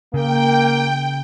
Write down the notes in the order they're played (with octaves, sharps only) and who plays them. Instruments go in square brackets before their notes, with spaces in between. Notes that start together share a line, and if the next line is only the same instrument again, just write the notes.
[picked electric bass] C#3 [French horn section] A#3 [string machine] G5